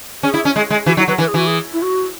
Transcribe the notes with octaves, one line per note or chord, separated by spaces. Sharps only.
C#4 G#4
E4
C#4
G#3
G#3
E3 F#4
F#3 E4
F#3 B4
E3 B4
G#4
E3 F#4
G#4
E4
F#4